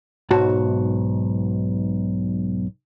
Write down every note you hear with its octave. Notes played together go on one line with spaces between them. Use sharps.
B1 G#2 F#4 A5